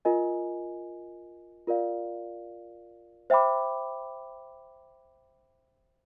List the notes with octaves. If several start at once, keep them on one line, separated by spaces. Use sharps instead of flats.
F4 A#4 D#5 G#5
F4 A#4 D5 F5
C5 E5 G5 B5 D6